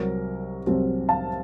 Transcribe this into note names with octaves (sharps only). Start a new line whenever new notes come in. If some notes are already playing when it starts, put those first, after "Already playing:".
Already playing: C2 C3 F#3 C4 A#4
C2 C3 F#3 C4
F5 A5